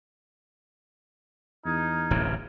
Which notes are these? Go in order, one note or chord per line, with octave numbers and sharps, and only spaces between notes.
E2 D#4 F6 G#6
D1 A1 C3